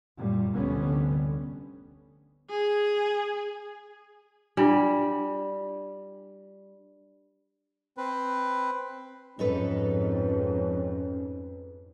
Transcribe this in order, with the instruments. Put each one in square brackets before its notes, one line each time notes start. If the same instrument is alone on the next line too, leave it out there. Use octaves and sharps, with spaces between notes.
[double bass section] F#2 A#2 G3
F1 D2 D3 G3 B3 C#4
[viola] G#4
[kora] G3 [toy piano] D4 E4 F4
[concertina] C4 B4
[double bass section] F2 G#2 [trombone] C#4 [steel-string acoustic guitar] D#4 A4 B4